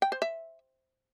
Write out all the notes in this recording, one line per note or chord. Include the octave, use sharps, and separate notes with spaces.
G5
C5
E5